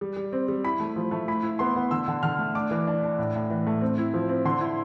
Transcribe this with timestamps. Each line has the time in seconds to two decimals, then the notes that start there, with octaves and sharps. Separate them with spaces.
0.01 G3
0.17 G3
0.33 C4
0.48 G3
0.64 E4 B5
0.80 A3
0.96 F3
1.11 A3
1.28 E4 B5
1.43 E4
1.59 B3 C6
1.76 B3
1.91 D3 E6
2.08 D3
2.23 D3 F6
2.38 A3
2.55 D4 D6
2.71 E3
2.87 D4
3.03 D4
3.19 A2
3.35 A2
3.50 E3
3.67 A3
3.81 C4
3.98 E4
4.14 F3
4.29 C4
4.45 D3 C6
4.61 E4